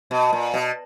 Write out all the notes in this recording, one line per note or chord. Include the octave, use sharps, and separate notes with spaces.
B2
A#2
B2